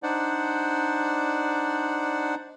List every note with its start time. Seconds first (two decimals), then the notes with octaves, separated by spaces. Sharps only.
0.03 D4 D#4 C5 D5 F#5